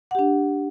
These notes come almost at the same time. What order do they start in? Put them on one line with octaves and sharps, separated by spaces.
F#5 G4 D4